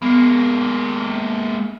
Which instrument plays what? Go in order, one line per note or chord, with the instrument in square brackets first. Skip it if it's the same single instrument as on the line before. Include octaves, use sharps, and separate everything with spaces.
[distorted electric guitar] G#3 A#3 [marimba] B3